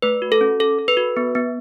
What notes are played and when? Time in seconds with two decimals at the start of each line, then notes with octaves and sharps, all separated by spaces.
0.02 A3 B4
0.22 F#4
0.32 A4
0.41 C#4
0.60 A4
0.78 A4
0.88 B4
0.97 F#4
1.17 B3
1.35 B3